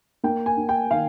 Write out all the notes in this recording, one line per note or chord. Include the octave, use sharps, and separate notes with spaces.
A#3 G5
G#5
A#3
G5
D#3 F5